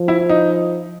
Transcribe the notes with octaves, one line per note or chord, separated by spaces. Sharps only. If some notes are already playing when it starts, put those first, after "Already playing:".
Already playing: F3
E4
D#4